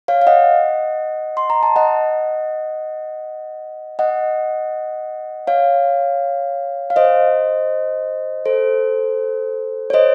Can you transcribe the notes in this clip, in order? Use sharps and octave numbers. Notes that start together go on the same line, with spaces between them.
C#5 F5
F5
D#5 F#5
C6
A#5
A5
D#5 F#5
D#5 F#5
C#5 F5
F5
C5 D#5
A4 C5
C#5
C5 D#5